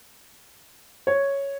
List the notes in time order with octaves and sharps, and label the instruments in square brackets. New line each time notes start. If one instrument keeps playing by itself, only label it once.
[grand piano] C#5